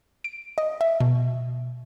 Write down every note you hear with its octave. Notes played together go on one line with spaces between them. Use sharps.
D7
D#5
E5
B2